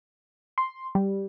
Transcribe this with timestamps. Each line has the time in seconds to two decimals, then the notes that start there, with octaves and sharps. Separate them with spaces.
0.58 C6
0.95 G3